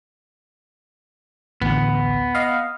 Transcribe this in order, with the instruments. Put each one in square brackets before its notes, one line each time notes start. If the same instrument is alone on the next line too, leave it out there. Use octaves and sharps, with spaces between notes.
[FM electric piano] A1 D2 [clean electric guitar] B3
[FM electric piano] D#5 F5